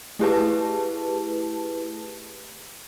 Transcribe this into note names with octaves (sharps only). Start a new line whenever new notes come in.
A3 E4 G4 G#4 B4 A5